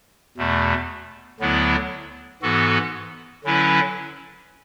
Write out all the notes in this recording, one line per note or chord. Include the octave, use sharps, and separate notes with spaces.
E2 B2 A3
D2 D3 F#3 B3 E4
G#2 E3 B3 F#4 A4
D3 F#3 C#4 E4 B4